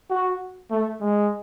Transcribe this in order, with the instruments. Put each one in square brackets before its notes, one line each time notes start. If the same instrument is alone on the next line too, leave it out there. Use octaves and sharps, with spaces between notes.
[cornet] F#4
A3
G#3